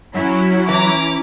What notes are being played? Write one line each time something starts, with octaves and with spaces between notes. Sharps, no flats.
F#3 C#4 E4
E3 A#5 D6